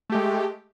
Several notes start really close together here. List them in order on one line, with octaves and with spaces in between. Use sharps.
A3 G4 G#3